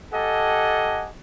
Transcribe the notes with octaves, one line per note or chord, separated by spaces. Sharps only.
G4 A4 D#5 F#5 G#5 A5